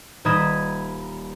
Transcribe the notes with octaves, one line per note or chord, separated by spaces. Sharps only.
D#1 D#4 B5 D#6 G#6 E7